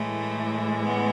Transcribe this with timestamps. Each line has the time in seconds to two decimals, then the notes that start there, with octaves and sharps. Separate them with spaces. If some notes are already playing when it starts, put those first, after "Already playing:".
Already playing: A2 E3 G#3 A3
0.82 B3